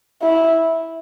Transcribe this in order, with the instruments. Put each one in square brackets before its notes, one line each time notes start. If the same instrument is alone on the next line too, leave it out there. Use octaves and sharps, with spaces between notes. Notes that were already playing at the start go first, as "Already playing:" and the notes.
[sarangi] E4